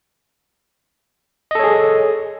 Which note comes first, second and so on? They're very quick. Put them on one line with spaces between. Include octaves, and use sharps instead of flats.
D#5 A4 C#5 G#4